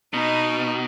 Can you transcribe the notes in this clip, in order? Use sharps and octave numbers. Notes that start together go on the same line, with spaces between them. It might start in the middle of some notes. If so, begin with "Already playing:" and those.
B2 D#4